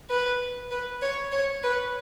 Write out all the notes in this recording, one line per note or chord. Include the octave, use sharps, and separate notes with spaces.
B4
B4
C#5
C#5
B4